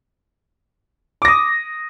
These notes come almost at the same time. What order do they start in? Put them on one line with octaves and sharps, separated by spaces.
D6 A#6 D#6